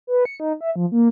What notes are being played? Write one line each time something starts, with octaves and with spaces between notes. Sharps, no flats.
B4
C#7
D#4
E5
F3
A#3